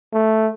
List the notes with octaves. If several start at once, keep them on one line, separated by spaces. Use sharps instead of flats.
A3